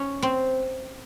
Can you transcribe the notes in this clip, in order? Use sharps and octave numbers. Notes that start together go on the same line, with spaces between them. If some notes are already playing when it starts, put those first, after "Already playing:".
Already playing: C#4
C4